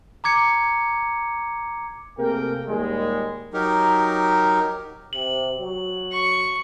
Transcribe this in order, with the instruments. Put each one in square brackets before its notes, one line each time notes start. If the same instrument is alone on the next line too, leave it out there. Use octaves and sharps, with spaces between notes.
[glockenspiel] A#5 D6 G#6 C#7
[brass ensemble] C3 A3 A#3 G#4 A#4 G5
D#2 A#2 G3 G#3
[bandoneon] F#3 D#4 G4 A#4
[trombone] C3 [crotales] F#7
[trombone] F#3
[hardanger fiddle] C#6